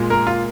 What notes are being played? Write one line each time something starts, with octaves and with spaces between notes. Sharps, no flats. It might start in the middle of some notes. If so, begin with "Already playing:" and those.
Already playing: A#2 G#3
A#3 A#4
F4